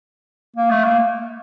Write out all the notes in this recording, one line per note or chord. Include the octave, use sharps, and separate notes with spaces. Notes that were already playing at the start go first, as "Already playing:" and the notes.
A#3
A3
A#3